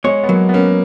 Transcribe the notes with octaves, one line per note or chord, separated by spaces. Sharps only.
G#3 C#5
B3
F#3 A#3
B3
A#3 C#4